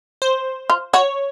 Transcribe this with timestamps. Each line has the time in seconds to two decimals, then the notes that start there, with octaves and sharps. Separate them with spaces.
0.22 C5
0.70 F4
0.93 F#4 C#5